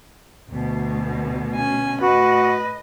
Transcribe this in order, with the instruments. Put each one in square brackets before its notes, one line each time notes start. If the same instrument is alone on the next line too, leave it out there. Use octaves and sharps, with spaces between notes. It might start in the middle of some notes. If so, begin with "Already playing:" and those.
[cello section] D2 B2
[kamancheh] C#4 G#5
[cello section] A2 D#5 [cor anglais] F#4 [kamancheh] B4